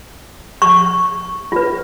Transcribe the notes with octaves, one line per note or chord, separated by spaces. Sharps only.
C#6
F4 B4